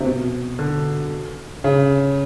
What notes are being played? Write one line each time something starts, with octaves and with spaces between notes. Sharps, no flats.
C3
B2
D3
C#3